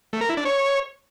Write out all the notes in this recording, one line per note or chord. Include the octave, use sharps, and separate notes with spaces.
A3
A#4
E4
D4
C#5